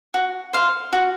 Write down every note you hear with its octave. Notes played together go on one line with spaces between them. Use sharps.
F#4
C5 F5
F#4